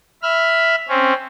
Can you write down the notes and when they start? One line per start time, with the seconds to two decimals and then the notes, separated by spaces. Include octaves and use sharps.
0.23 E5 B5 F6
0.88 C4 C#4